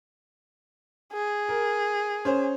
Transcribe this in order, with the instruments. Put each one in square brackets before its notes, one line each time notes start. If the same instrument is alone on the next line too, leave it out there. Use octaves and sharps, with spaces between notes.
[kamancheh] G#4
[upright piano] A#4
C#4 C5